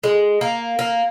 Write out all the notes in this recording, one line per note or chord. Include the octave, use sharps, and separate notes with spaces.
G#3
A#3
A#3